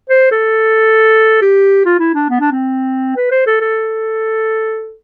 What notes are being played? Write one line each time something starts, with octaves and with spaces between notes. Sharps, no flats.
C5
A4
G4
F4
E4
D4
B3
D4
C4
B4
C5
A4
A4